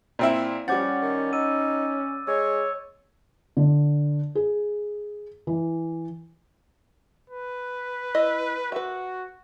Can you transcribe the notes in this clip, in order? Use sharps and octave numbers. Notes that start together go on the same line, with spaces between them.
A#2 C4 E4
F3 G3 C#4 F#5 D6 G6 A6
D#3
D#4 E6 D#7
G#3 C#5 E6
D3
G#4
E3
B4
E4 D#5
F#4 B4 E5